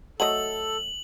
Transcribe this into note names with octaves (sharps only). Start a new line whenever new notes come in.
F#3 A3 A4 D#5 F#7